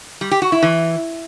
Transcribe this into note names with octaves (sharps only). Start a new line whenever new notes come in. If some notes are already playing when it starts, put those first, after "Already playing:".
G3
G4
F#4
E4
E3